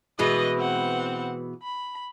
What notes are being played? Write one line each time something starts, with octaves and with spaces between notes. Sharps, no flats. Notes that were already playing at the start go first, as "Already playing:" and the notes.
B2 E3 G#3 B4 D#5
C4 F#5
B5